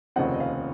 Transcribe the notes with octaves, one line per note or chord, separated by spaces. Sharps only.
F1 D#2 C#3 F3 C4 D#5 F#5
D#5
F5